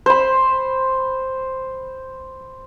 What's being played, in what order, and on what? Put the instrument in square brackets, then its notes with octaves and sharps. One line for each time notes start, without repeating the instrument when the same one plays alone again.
[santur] C5 B5